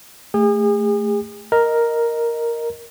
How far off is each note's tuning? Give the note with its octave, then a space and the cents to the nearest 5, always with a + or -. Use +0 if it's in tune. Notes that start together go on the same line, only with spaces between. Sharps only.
A3 +0 G#4 -35
A#4 +0 D#5 +0